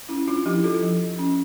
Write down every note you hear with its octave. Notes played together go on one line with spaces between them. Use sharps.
C#4 E4
D4 F4
F3 E4 G4
F4 A4
F3
C#4